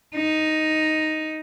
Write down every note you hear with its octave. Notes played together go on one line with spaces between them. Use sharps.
D#4